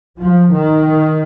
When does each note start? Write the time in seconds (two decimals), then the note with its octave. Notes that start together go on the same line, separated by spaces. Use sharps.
0.19 F3
0.52 D#3